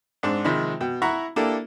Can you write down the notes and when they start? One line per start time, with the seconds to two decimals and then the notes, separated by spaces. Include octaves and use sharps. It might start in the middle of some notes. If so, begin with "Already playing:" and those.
0.23 G#2 C4 D4
0.45 C3 D#3 F3 G#3 B5
0.81 B2 G5
1.02 E4 F#5 A#5 B5 C#6
1.36 A#3 D4 E4 G4 A4